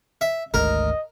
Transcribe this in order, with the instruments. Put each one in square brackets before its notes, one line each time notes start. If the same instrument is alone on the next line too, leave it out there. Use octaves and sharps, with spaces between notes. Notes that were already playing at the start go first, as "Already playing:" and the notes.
[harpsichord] E5
[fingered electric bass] G#1 D2 [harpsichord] A#4 [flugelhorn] D#5